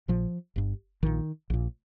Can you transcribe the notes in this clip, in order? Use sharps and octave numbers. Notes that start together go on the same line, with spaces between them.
A#1 A#2 F3
G1 G2
A#1 A#2 D#3
A#1 A#2